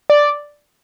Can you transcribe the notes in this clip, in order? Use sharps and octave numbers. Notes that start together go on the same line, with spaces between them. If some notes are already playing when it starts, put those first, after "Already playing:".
D5